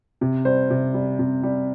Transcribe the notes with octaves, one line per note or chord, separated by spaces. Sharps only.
C3
G3 C5
C3
G3
C3
G3